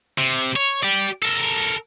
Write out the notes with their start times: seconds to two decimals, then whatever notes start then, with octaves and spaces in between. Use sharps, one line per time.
0.18 C3
0.56 C#5
0.83 G4 D5
1.23 A4 A#4